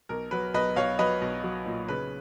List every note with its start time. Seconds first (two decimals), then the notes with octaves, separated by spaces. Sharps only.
0.09 B1 A#4
0.31 F#3 B4
0.54 B1 B4 D#5
0.76 B1 C#5 F5
0.99 F#3 B4 D#5
1.21 B1
1.43 F#3
1.66 A#2
1.88 C#3 B4